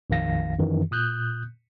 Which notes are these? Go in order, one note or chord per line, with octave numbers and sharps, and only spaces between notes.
A#1 F2 D#3 F5 A#6
F#2 D#3 E3
A#2 D#6 F#6 G6